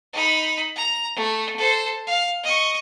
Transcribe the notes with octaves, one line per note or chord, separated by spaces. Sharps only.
D#4 B5
A#5
A3
A4 C5
F5
D#5 C#6